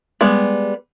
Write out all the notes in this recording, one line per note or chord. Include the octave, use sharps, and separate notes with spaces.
G3 G#3 B3